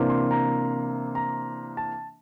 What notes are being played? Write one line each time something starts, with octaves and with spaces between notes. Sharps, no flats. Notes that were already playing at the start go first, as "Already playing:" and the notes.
Already playing: C3 E3 A#3 D4
C6
A#5
A#5
A5